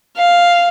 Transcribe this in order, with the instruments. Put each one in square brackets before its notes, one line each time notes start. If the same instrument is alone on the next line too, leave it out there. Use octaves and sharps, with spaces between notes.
[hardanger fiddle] F5